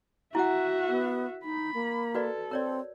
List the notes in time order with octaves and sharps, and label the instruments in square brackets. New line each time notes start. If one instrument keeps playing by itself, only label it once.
[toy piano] E4 F#5 [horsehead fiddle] F#4 E5
[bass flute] B3 [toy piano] A#4
[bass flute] D#4 [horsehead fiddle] B5
[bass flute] A#3
[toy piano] F#4 B4 D5 [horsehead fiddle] A4
[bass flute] C4 [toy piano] A#4 C#5 D5